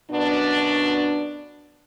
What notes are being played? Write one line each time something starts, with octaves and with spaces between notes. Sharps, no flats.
F#2 B2 B3 D4